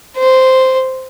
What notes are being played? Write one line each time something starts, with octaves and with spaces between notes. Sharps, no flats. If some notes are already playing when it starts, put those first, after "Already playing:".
C5